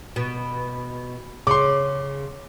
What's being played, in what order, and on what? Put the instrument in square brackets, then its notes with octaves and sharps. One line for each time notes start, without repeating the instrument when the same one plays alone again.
[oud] B2
[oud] C#3 [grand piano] C6 D6